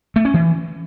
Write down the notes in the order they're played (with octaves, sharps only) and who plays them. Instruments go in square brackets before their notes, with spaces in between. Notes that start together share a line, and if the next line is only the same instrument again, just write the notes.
[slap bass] A3
C#4
E3